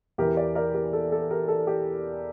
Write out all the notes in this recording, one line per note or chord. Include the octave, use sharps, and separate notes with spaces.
E2 E3 G4 A#4
A#4 D5
A#4 D5
G4 A#4
A4
A4
G4 A#4
A4
G4